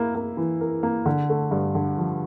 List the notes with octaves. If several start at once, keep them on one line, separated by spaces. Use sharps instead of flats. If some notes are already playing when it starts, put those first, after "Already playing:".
Already playing: A#3 E4
A#3
E3
A#4
A#3
D3
A3
G2
D3
F3